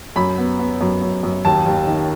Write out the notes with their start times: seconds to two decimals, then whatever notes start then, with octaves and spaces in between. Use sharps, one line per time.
0.16 F#2 B5
0.38 B3
0.59 B3
0.81 F#2
1.02 F#2
1.23 F#2
1.45 D#2 A5
1.66 D#2
1.87 D#3